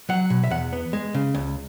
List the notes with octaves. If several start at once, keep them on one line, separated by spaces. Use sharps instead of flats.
F#3 F#5
B2
E5
E2 F#5
B3
G#3
C#3
C#2